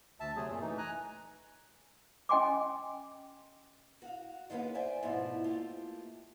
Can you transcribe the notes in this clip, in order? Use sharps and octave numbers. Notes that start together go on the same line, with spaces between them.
D2 E5 A5
C3 F#3 A3 G#4
F#2 A#2
E3 A3 D#4
G#5 A#5 F#6
C#4 D#5 G5 G#5 C6 D6
F#4 F5
D#3 G#3 A#3 B3 C#4
C5 D5 E5 G5 G#5
G#2 B2 F3 A3 E4
A3 A#3 F4 G4